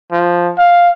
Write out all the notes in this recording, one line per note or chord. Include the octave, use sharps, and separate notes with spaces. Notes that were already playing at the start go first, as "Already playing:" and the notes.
F3
F5